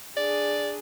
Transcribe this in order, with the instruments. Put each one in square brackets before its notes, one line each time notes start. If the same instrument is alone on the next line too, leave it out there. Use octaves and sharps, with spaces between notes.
[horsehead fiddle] D4 G#4 [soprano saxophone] D5